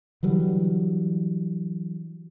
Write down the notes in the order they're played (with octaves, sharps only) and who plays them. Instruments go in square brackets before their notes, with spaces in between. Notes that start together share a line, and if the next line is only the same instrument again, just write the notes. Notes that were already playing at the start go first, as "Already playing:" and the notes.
[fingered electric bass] D3 E3 F#3 G3